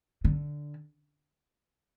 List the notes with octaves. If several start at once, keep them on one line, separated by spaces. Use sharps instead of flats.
D3